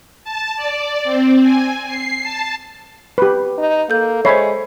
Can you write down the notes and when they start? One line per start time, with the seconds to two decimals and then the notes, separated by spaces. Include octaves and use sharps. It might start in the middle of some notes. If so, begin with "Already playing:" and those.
0.24 A5
0.56 D5
1.04 C4
1.42 G#5
1.87 C7
2.23 A5
3.18 G4 B4
3.58 D#4
3.90 A#3 A4 G6
4.25 G#3 C5 C#5 E5 B5 C7